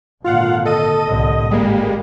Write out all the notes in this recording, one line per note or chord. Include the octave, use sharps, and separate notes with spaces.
G#1 A#2 D3 F4 F5 F#5
A4 D#5 D#7
C2 A2 D3 D#5
G#1 G3 G#3 A#3